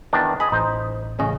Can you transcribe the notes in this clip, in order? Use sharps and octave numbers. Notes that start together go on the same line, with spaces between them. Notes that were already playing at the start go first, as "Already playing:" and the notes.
E2 D#3 D4
G#4 D#5 B5
A1 D#4 C5
A1 C#3 C#4 D#5